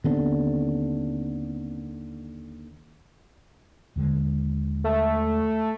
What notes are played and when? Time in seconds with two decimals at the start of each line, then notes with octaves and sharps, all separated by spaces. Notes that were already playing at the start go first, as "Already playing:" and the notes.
0.04 D#2 D3 D#3 B3 C4
3.96 D#2 D3 G#3
4.84 A3